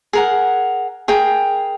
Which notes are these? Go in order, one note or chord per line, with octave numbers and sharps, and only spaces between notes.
G#4 A#4 F#5
G#4 A#4 G5